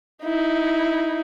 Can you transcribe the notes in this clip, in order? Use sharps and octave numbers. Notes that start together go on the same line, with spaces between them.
D#4 E4